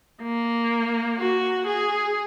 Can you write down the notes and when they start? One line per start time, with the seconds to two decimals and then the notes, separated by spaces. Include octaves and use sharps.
0.23 A#3
1.18 F#4
1.66 G#4